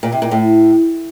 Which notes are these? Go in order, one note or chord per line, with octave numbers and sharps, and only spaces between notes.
A#2
C3
A#2
A2